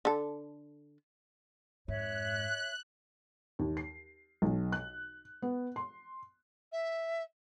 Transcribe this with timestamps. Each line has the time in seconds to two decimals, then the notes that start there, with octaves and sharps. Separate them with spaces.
0.05 D3 A4
1.88 F2 G#2 C#5 E5 F#6
3.59 D#2
3.77 C7
4.42 B1
4.72 F#6
5.42 B3
5.76 C6
6.72 E5